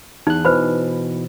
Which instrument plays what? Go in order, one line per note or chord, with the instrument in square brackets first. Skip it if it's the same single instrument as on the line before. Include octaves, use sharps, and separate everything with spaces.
[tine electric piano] E2 F#6 [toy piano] D#4
[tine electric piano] B2 E3 [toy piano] B4 C5 B5